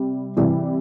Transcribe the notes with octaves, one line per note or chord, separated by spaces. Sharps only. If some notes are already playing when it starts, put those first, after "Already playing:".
Already playing: C3 G3
C3 E3 G3